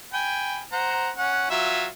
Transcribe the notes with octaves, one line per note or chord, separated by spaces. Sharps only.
G5 G#5 B5
C5 F#5 A#5
C#4 F#5
F#3 F4 E5